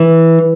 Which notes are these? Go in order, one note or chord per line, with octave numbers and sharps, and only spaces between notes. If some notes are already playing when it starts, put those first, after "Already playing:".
Already playing: E3